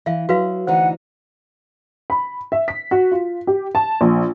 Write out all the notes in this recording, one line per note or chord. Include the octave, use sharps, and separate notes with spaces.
E3 E5 F5
F#3 F#4 B4 F5
D2 E3 D#4 C5 F#5
B5
E5
B6
F#4
F4
G4
A5
A#1